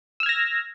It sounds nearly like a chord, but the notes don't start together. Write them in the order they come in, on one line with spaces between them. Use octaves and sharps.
E6 F6 G#6 A#6